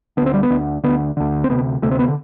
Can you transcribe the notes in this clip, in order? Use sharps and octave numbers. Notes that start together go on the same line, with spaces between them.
D2 D3 B3 C4
G3
B3
D2 D3
D2 D3 B3
D2 D3
C4
D2 C3 B3
D2 C3 A3
C4
B3
D3